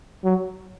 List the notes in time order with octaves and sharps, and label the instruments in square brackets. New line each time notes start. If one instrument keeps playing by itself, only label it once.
[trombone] F#3